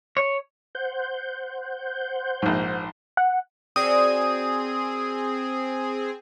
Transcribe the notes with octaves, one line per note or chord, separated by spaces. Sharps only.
C#5
C5 F#5 G6
A#1 G#2
F#5
C4 F#4 G#4 A#4 D5 D#6